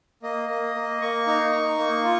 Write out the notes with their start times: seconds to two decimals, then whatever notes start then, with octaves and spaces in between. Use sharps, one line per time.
0.23 A#3 D#5
0.48 A#3
0.75 A#3
1.01 A#3 C#6
1.27 D#4
1.52 D#4
1.78 A#3
2.04 F4